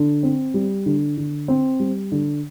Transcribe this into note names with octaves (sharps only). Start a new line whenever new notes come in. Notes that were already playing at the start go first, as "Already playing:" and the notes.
Already playing: D3
C4
G3
D3
D3
C4
G3
D3